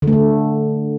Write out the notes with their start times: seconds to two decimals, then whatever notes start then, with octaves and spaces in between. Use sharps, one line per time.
0.02 D3
0.07 A3
0.13 D3